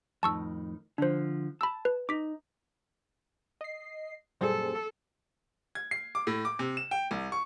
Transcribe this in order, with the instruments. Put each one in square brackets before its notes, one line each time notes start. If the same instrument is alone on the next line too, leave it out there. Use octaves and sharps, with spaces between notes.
[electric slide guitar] F2 A2 D#3 [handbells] A5 C#6 E6
[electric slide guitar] D3 F3 [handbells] D4 C5
[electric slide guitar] A5 [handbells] B5 E6
[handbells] B4
[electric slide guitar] D#4 [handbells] D6 B6
[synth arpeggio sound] D#5 C7
[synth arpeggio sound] F#2 A#2 G3 [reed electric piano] G#4 C5 [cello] A4
[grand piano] G#6
C7
D6
A2
D6
C3
E7
G5
C2
C#6